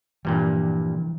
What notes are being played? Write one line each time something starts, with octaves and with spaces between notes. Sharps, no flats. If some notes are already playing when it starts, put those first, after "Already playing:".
G2 A#2 E3 F3 G3